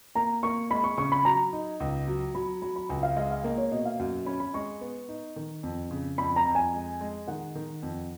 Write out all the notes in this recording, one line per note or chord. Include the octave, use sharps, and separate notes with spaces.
A#3 A#5
A#3 C#6
G#3 B5
C#6
C#3 C#6
B5
F#3 A#5
D#4
C#2
F#3
F#3 B5
F#3 B5
B5
C#2 G#5
F5
G#3 F5
F5
A#3 D#5
C#5
B2 D#5
F5
F#2 F#5
C#4 B5
B5
G#3 C#6
B3
D#4
D#3
F2
C#3
F2 B5
A#5
F2
G#5
G#3
G#3
D#3 F#5
D#3
F2